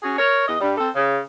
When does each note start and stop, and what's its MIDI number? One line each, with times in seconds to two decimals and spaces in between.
0.03 0.17 61
0.03 0.17 66
0.03 0.17 68
0.18 0.45 70
0.18 0.45 73
0.48 0.56 40
0.48 0.56 75
0.60 0.74 43
0.60 0.74 55
0.77 0.89 60
0.77 0.89 69
0.95 1.20 49